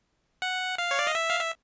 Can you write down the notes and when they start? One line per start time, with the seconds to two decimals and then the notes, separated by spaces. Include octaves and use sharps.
0.42 F#5
0.78 F5
0.91 C#5
0.99 D5
1.07 D#5
1.15 E5
1.30 F5
1.40 E5